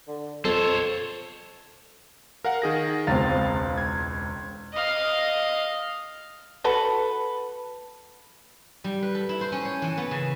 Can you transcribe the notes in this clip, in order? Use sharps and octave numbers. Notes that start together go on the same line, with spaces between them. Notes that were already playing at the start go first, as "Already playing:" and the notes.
D3
F2 A4 C5 C#5
A#4 F5 F#5
D#3 G#4 A#6
E1 C#2 C4 F5 A6
G#6
D#5 F5
F#4 A4 B4
G3
B4
A4
E4
C5
C#4
C#5
E3
B3
C#3